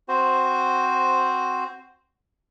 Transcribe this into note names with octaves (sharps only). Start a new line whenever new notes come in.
C4 F#4 C5